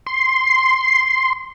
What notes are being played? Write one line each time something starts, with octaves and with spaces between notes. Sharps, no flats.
C6